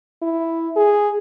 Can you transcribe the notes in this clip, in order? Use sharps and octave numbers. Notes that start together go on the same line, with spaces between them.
E4
G#4